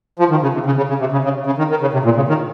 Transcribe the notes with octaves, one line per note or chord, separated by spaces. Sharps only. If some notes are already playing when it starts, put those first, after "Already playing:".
F3
D#3
C#3
C3
C#3
C#3
C#3
C3
C#3
C#3
C#3
D#3
D#3
C#3
C3
A#2
C#3
D#3